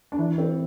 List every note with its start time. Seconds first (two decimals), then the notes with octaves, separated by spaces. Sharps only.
0.12 D4
0.18 E3 E4
0.38 C4